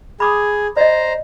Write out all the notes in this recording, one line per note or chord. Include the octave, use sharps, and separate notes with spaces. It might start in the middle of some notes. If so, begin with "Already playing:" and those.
G#4 B5 D6 D#6
C5 D5 D#5 A#5